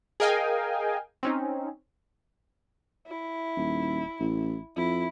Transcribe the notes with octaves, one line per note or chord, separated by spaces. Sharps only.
G#4 A#4 D#5 F5 G5 G#5
C4 C#4 D#4
E4
D#1
A1
F2 E4